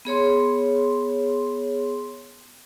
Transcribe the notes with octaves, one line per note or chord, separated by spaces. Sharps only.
B3 G#4 C#5 C6